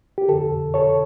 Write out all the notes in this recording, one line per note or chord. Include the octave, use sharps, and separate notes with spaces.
G4
F2 D3 A4
A4 C#5